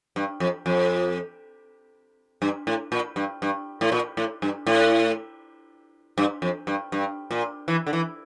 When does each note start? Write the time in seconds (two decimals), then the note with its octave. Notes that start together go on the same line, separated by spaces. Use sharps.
0.16 G2
0.40 F2
0.66 F2
2.42 G2
2.67 A2
2.92 A#2
3.16 G2
3.42 G2
3.81 A2
3.92 A#2
4.17 A2
4.42 G2
4.67 A2
6.18 G2
6.42 F2
6.67 G2
6.92 G2
7.31 A#2
7.68 E3
7.87 D3
7.93 E3